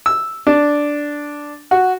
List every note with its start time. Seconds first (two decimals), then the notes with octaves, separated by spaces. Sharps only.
0.06 E6
0.47 D4
1.71 F#4